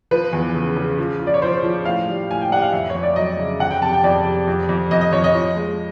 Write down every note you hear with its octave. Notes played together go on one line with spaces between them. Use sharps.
F3 B4
E2
C#3
C#3
F3
F3
D5
C#5
F3 C5
F3
A2 F5
G3
A2 G#5
G5
G3 F#5
F5
F2 E5
C#5
F2
D5
F#3 D#5
C#3
F2 F#5
G5
C3 A5
G5
F2 D5
C3
F2
F2
F2 D#5
D#5
F2 C#5
D#5
F3
G#3